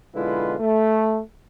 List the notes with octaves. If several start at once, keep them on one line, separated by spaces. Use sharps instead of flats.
B1 D3 G#3 E4 F4 B4
A3